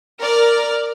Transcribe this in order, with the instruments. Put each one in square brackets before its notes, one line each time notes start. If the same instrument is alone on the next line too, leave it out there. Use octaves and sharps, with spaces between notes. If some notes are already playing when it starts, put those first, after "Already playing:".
[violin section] A#4 D5 F6